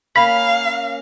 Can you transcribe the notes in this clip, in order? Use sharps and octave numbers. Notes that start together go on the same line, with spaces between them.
A#3 C#4 F5 B5